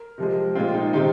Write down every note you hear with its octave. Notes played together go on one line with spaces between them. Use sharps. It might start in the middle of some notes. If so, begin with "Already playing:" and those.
Already playing: A#4
C3 F3 G#3
A#2 G#3 C4 F4
D#4
C3 D#3 G#3 C4 D#4